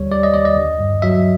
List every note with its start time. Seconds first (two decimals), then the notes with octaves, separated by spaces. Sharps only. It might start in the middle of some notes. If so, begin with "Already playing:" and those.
Already playing: D#2 D3 G3 C#5
0.11 G3 D5
0.23 D#5
0.34 D#2 D5
0.45 D#5
0.57 D3
0.79 G2
1.02 F#3 E5